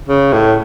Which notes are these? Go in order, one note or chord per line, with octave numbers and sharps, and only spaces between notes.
C#3
A2